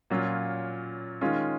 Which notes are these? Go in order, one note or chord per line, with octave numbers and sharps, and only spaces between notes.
A#2 F#3 C#4 F4
D#3 G#3 C#4 F4